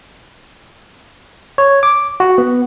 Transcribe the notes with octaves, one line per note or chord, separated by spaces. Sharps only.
C#5
D6
F#4
B3